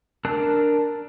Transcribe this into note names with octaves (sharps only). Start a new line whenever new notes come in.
D4 A#4 A5 E6 F#6